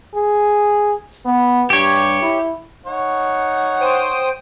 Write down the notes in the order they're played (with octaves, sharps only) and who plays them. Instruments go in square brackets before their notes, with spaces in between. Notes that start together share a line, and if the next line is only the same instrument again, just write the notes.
[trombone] G#4
B3
[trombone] G2 [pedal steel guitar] G4 C#5
[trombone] E4
[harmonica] D#4 C#5 F#5
[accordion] C5 G5 D#6